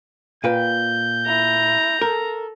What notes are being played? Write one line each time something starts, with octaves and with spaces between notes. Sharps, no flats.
A#2 B4 G5 G6
E4 A#5
A4 A#4